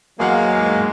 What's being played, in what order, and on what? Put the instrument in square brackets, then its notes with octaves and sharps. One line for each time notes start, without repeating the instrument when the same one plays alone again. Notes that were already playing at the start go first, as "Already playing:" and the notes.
[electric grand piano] E2 F5 F#5 [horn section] F#3 A#3 [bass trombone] G#3
[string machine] G#2